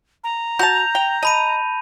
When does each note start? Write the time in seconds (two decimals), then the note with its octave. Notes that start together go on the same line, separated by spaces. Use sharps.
0.24 A#5
0.59 F#4 A5 G6 A#6 F7
0.95 G5
1.23 D#5 A5 B5 D#7